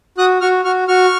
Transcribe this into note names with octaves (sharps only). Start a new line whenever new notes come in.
F#4 D#6 F#6
F#4 C#6 F6
F#4 C#6 F6
F#4 C#6 F6